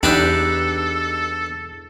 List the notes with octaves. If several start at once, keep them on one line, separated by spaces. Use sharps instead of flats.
E2 D4 D#4 G4 A4 B4